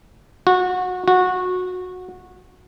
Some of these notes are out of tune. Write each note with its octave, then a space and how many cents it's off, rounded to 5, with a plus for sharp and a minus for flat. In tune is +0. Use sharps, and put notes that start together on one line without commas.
F#4 -25
F#4 -20